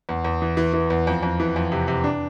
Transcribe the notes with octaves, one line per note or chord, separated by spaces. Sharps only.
E2
E2
E3
E3
E3
E2
F2
F2
E3
F2
C3
C3
D4